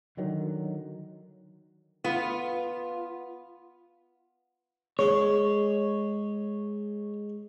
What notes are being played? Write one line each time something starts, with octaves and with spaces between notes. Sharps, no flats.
D3 D#3 F#3
B3 F4
G#3 C#5